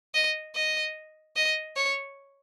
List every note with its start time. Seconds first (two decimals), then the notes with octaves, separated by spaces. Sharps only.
0.14 D#5
0.55 D#5
1.36 D#5
1.76 C#5